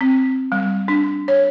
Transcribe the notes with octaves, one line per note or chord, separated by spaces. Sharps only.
C4
G3
D4
C#5